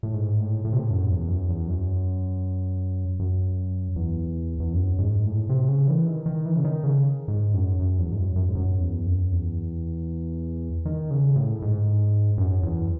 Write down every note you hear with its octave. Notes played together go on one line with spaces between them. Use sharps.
A2
G#2
A2
A2
C3
A2
F#2
E2
F#2
E2
F#2
F#2
E2
E2
F#2
G#2
A2
C3
C#3
E3
D#3
D#3
E3
C#3
D#3
C#3
G#2
F#2
F#2
E2
G#2
F#2
F#2
G#2
F#2
E2
F#2
E2
D#3
C#3
A2
G#2
F#2
E2